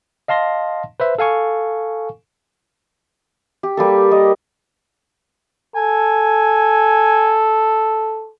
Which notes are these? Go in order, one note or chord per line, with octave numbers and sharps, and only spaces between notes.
D#5 F5 A5 C6 A#6
B4 C5 E5
A4 F5 G#5 C#6
G4
G3 A#3 A4
A#4 D#5
A4 G#5